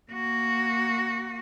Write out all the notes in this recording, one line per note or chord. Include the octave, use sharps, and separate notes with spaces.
A#3 F#4